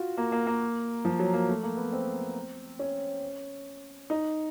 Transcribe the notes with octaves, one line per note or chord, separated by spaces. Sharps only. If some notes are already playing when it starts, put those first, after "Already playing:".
Already playing: F4 F#4
A#3
A#3
A#3
F3
F#3
A#3
A3
A#3
B3
C4
C#4
D#4